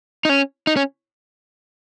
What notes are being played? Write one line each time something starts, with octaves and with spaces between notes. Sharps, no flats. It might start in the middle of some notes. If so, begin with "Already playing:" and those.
D#4
C#4
D#4
C#4